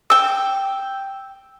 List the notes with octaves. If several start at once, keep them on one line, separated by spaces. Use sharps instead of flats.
G5 E6